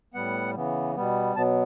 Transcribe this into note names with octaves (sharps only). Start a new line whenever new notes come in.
A2 G3 B3 F#5
C#3 E3 B3
B2 G3 B3
B2 F#3 B3 A5